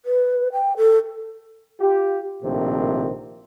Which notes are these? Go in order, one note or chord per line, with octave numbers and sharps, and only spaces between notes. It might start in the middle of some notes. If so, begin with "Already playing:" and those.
B4
G5
A4
F4 G4
A#1 A2 C3 D#3 C4